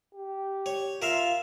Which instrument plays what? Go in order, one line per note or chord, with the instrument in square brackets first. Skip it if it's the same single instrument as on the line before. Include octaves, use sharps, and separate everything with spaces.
[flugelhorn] G4
[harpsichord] C#5
[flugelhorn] F4 [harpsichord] A#4 E5 F5